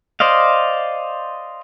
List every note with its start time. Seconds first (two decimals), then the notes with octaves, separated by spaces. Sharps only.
0.20 C5 D5 D#5 F5